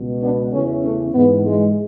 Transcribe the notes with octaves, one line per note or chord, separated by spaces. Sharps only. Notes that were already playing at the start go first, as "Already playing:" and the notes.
Already playing: C#2 B2
B3 D4
E2 C#3 E3 A3 C#4
A3 C#4
G#2 E3 G#3 B3
G#3